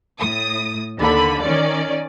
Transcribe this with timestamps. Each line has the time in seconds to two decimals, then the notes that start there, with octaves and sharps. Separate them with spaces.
0.19 A2 D#6
0.98 D#2 D3 B5
1.42 D#3 C#4 D5